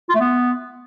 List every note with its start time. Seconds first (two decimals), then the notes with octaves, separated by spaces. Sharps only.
0.09 F4
0.15 A3
0.20 B3